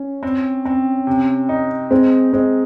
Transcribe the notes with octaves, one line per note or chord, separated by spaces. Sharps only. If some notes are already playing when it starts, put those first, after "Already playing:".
Already playing: C#4
C4
C4
C3
D#4
G#3 C4
G#3 C4